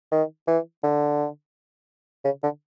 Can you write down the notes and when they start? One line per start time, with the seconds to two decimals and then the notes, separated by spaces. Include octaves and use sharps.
0.12 D#3
0.48 E3
0.84 D3
2.25 C#3
2.44 D3